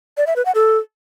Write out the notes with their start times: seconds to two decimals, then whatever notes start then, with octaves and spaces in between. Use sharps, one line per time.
0.17 D5
0.27 E5
0.36 B4
0.45 F#5
0.55 A4